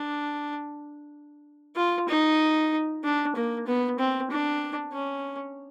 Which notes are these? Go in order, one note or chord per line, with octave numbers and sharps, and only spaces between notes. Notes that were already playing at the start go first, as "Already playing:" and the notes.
Already playing: D4
F4
D#4
D4
A#3
B3
C4
D4
C#4